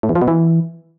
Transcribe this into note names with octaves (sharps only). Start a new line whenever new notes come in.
A2
E2
F3
B2
E3